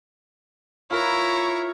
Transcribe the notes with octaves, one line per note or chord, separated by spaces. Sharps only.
E4 F4 A#4 B4 C#5 A#5